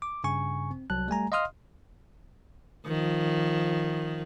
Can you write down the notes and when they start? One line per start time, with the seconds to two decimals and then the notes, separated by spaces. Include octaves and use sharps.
0.02 D6
0.24 G2 C#3 G#5 C#6
0.71 C4
0.90 C2 F#3 A5 F#6
1.08 G3 A3 G#5 A#5
1.32 D#5 F5 C6 D#6 F6
2.86 D#3 F3